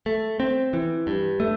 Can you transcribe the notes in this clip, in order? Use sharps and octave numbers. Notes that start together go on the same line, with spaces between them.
A3
C4
E3
G2
A3